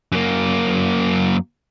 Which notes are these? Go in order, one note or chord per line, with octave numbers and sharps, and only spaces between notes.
F#2 A#3